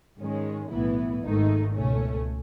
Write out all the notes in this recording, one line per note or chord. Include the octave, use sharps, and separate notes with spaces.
G#2 D#3 G#3 C#4
B1 A2 E3 B3 E4
G#1 G#2 D#3 A3 D#4
C#2 B2 A3 C#4